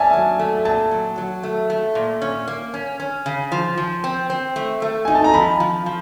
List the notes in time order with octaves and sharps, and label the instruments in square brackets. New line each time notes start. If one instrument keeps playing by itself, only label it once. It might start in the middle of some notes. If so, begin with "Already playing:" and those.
Already playing: [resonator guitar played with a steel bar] C#4 [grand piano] D5 E5 G#5 A5
[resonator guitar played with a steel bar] F#3
A3
[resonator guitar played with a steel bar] A#2 [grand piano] A5
[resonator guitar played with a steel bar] F#3
F#3
A3
A3
A#2
C#4
A#3
C#4
C#4
C#3
F3
F3
C4
C4
A3
A3
[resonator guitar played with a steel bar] D#4 [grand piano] G#5
[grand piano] A5
A#5
[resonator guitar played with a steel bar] F3 [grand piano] B5
[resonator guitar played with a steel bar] F3
F3